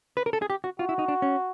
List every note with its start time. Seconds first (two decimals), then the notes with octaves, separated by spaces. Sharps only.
0.17 B4
0.26 A#4
0.33 A4
0.42 G#4
0.50 G4
0.64 F#4
0.79 F4 F#4
0.89 E4
0.99 D#4
1.08 D4
1.22 C#4